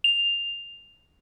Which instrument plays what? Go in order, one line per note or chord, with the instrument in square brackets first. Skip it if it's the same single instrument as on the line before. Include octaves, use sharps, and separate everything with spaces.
[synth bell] F7